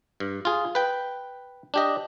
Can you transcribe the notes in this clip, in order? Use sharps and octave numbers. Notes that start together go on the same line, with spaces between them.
G2
F4 G#4
B4 G5
D4 G4 D#5